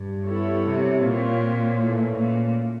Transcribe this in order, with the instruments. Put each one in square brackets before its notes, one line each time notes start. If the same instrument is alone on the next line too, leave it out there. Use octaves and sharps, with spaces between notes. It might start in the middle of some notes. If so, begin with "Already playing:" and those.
Already playing: [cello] G2
[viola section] G3 B3 E4 A4 C#5
[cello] C3
[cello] A#2 [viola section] C4 F4 A#4 C#5
[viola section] E3 A3 C#4
[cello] A#2